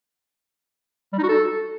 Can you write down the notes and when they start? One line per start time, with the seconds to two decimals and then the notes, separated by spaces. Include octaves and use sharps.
1.13 G3
1.18 D#4
1.23 F#4
1.29 A4